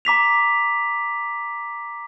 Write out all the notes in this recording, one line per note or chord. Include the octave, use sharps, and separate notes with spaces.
A#5 D6 B6 F7